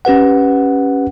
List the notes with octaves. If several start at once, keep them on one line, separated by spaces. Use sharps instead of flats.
C#4 G4 B4 F#5